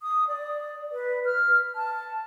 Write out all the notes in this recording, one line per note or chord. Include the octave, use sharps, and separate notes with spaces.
D#6
D5
B4
F6
A5